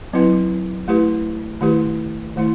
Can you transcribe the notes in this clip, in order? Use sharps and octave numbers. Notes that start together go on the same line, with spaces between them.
F#3 C4 E4 B4
A3 E4 G4 B4
D#3 A3 E4 G4 B4
D#3 A3 E4